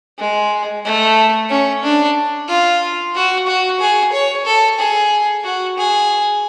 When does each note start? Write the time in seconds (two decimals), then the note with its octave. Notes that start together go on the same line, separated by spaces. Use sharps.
0.19 G#3
0.85 A3
1.50 C#4
1.84 D4
2.48 F4
3.15 F#4
3.47 F#4
3.80 G#4
4.13 C#5
4.46 A4
4.79 G#4
5.44 F#4
5.78 G#4